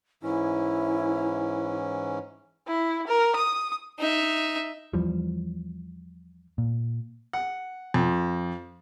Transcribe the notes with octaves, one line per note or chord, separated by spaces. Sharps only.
G#2 E3 C#4 E4
E4
A#4
D#6
D#4 E5
E2 E3 F3 G3
A#2
F#5
F2